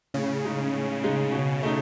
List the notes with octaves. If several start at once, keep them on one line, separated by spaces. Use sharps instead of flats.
A2 C#3
G#3 D#4
A2
G#3 D#4
B2
A3 D#4